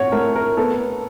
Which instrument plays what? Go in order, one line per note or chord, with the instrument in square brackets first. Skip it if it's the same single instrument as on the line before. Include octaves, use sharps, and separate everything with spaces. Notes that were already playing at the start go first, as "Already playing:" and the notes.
Already playing: [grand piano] A2 C4 [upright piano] C#5 F#5
[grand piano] A3 [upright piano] A#4
[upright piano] A#4
[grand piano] B3 [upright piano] A4